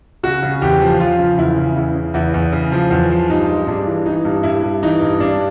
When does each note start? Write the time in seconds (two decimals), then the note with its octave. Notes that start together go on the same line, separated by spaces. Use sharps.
0.23 C#3 F#4
0.43 C#3
0.62 E2 G4
0.81 F3
1.00 F3 F4
1.19 C#3
1.38 E2 E4
1.58 C#3
1.77 E2 E4
1.96 C#3
2.14 E2 E4
2.34 E2
2.52 C#3
2.72 F3
2.91 E2
3.10 F3
3.30 G2 D#4
3.48 G#3
3.67 G2 D4
3.87 E3
4.06 E3 D#4
4.25 G2
4.43 G2 E4
4.62 G2
4.83 E3 D#4
5.02 G2
5.20 G2 D4